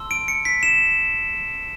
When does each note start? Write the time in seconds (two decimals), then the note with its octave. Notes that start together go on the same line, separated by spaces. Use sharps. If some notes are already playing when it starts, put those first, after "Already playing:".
Already playing: A5 C6 E6
0.11 D7
0.28 C#7
0.45 B6
0.63 E7